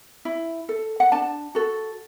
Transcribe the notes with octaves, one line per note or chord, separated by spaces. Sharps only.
E4
A4
F#5
D4 A5
F#4 A4